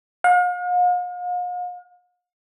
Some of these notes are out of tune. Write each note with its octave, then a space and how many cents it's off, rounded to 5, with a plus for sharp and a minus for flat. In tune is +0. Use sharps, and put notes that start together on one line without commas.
F5 +45